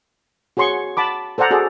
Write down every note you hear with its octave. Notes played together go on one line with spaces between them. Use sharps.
F#4 G#4 C#5 C6 C#6
F#5 A5 B5 D6
A4 C5 D5 F#5 A#5
F#4 G#4 A4 D5